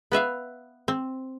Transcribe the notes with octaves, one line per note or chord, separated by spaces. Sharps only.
B3 B4 E5 F5
C4